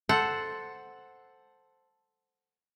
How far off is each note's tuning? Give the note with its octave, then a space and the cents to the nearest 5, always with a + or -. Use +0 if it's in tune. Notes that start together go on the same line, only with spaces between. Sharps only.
A4 +0 C5 +0 F#5 +0